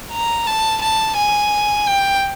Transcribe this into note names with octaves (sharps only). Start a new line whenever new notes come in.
A#5
A5
A5
G#5
G5